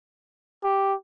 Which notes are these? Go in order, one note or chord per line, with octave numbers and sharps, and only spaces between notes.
G4